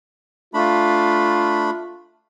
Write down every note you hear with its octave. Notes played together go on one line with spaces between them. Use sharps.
A3 D4 F4 B5